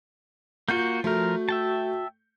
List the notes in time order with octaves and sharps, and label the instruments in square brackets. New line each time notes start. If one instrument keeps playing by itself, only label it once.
[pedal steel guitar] A#3 F#4 [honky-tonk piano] F4 G6
[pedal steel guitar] F3 A#4 [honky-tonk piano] A3 [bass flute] F#4
[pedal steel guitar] E5 G5 A5